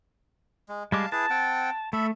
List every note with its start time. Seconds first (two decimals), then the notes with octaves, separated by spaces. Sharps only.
0.69 G#3
0.92 G3 G#3 F5 A5 D6
1.12 E4 G#4 B4 A5
1.30 C4 F#5 G5
1.93 A3 A4 E5 B5